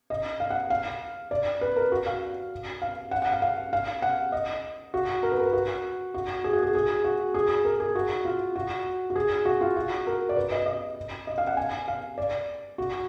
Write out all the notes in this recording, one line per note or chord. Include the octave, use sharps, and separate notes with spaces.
D#5
F5
F#5
F5
D5
B4
A#4
F#4
F5
F5
F#5
F#5
F5
F5
F5
F#5
D#5
F#4
A#4
B4
A#4
F#4
F#4
G#4
F#4
G#4
G#4
F#4
G#4
A#4
G#4
F#4
F4
F#4
F#4
G#4
F#4
F4
F#4
A#4
D5
B4
D#5
D#5
D#5
F5
F#5
G#5
F5
D5
F#4